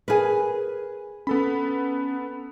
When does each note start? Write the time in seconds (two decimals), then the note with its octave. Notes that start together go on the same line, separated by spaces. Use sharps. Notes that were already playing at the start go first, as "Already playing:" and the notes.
0.08 G#4 A#4 B4 G#5
1.27 B3 C#4 A4 B5